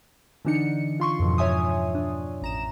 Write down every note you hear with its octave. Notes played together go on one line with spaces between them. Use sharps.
D3 E3 D4 D#4 C#7
F4 C6 C#6
F2 G#2 B2 F3
C#5 E5 G#5 D#6
D4
A1 A#5 E7